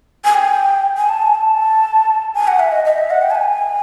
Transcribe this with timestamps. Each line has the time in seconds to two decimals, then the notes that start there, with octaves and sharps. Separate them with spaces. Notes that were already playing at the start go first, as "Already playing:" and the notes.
0.25 G#5
0.35 G5
0.97 G#5
1.09 A5
1.22 G#5
1.35 A5
2.34 G#5
2.48 F#5
2.59 E5
2.72 D#5
2.85 D#5
2.98 E5
3.10 F#5
3.22 G5
3.31 A5
3.35 G#5